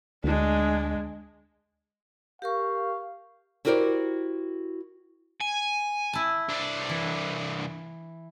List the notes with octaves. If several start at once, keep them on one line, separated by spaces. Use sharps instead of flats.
D2 G#3 D4
G4 A#4 F5 C#6
E4 F#4 G4 A#4 C5 D5
G#5
E4 A5
C2 D4
E3